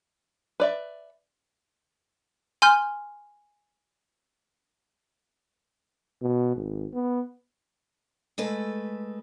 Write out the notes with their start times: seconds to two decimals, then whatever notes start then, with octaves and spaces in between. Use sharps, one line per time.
0.60 B4 D5 E5
2.62 G#5 C6 F6 G6
6.22 B2
6.56 G#1
6.94 B3
8.38 G#3 A3 A4 B4